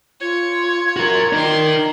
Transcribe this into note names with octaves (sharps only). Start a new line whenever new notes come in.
F4 C#5 G#6
F#4 A#4
D#4 A#4 D5 C6